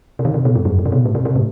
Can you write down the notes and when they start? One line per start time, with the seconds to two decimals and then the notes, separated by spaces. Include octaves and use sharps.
0.19 C3
0.25 D#3
0.34 C3
0.45 B2
0.55 G2
0.65 F#2
0.79 G2
0.86 C3
0.92 B2
1.05 A2
1.15 C3
1.25 C3
1.36 A2